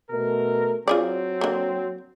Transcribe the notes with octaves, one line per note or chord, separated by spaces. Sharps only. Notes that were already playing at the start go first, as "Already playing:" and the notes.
B2 A3 A#4
F#3 C4 F4 G#4 D5
D3 A#3